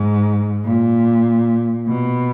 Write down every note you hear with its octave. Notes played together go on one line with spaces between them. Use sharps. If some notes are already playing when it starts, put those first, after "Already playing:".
Already playing: G#2
A#2
B2